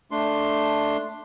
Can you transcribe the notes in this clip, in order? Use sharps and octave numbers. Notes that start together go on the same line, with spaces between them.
A3 D4 C6